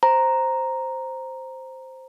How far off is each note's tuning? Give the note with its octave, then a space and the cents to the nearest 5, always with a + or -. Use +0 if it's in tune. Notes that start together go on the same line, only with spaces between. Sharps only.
C5 +0 A#5 +0